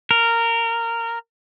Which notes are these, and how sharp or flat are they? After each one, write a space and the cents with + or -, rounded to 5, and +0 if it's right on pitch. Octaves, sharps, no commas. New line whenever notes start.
A#4 -15